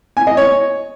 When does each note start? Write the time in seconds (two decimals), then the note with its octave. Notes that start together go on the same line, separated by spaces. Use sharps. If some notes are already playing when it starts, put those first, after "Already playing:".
0.17 G#5
0.27 D#5
0.37 C#5